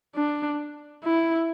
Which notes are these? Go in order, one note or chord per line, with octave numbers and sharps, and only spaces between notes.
D4
E4